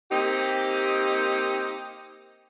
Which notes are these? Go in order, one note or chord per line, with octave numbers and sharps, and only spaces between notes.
A#3 C4 D#4 G4